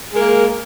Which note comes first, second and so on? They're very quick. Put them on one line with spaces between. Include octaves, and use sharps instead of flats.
G#3 A#4 A#3